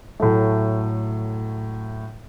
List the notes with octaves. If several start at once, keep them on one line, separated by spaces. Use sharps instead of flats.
A2 F#3 A3